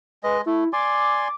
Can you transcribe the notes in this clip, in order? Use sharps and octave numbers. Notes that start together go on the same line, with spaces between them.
G#3 B4 D#5
A3 E4
D5 G#5 C6 D6